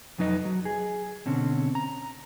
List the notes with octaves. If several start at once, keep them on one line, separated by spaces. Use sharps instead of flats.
F2 F#3 D#4 B4 D#5
F#3
G#4
B2 D3 C4 C#4
A#5